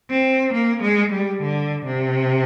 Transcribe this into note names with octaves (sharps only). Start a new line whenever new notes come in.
C4
A#3
G#3
G3
D3
C3